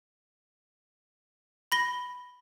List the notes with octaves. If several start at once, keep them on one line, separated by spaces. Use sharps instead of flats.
B5 A#6 G7